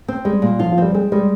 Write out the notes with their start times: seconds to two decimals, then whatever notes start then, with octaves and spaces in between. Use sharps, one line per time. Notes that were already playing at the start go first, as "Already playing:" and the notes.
0.08 C4
0.25 G3 G#3
0.42 A#2
0.59 F3 F4
0.72 F3
0.78 G3 C4
0.94 G#3 C4
1.12 G3 G#3